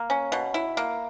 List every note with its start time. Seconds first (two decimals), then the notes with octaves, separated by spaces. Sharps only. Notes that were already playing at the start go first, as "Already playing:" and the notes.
Already playing: A#3
0.10 C#4
0.32 B2
0.54 E4
0.77 A#3